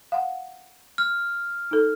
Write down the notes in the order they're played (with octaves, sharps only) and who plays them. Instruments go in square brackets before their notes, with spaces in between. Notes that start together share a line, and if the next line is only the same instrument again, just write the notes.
[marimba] F5 F#5
[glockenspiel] F6
[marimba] D#4 A4